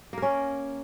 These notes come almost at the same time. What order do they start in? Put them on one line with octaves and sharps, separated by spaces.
A#3 A#4 C#4